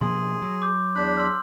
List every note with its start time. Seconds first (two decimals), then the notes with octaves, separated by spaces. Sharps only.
0.01 B2 F3 A#3 G#4 C6
0.42 F#3
0.62 D6 G6
0.96 E2 D4 B5 F#6 G6
1.17 C6 E6 F6